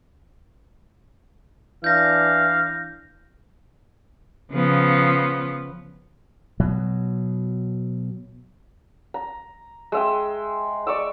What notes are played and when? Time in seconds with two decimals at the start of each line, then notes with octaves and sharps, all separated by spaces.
1.84 E3 D4 F5 G6 A#6
4.52 C#3 F3 B3
6.60 B2 F#3
9.14 A#5
9.92 G#3 E5 G5
10.87 D5 C#6 D6 E6